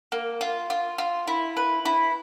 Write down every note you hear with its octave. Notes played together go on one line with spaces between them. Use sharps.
A#3
F4
F4
F4
E4
B4
E4